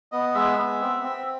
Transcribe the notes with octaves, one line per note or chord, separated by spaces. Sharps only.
B3 D#5
G#3 E5
B3
C4
C4